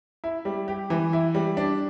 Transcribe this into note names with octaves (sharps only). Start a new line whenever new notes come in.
E4
G3
G4
E3
E4
G3
D4